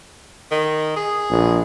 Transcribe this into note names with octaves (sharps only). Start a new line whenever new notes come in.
D#3
G#4
A#1